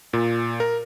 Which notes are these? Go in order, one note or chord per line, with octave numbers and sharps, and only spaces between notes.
A#2
A#4